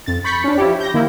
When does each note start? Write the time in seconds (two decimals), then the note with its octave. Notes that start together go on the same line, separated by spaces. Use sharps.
0.06 F2 A6
0.24 B5 C#6 G6 A6 B6 C#7
0.44 C#4 D4
0.58 F3 E4 G4
0.80 G6 A#6
0.94 D#3 A#3 E4